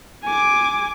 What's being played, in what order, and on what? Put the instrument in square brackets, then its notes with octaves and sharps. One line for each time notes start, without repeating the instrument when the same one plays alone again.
[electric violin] G#5 D6